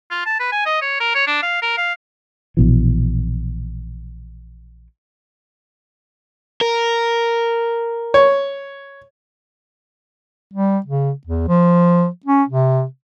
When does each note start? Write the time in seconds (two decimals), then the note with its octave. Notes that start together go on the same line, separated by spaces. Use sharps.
0.11 F4
0.26 A5
0.40 B4
0.52 G#5
0.66 D#5
0.82 C#5
1.00 A#4
1.15 C#5
1.27 D4
1.42 F5
1.62 A#4
1.77 F5
2.57 A#1 B2 E3
6.61 A#4
8.14 C#5
10.54 G3
10.86 C#3
11.27 E2
11.48 F3
12.26 C#4
12.49 C3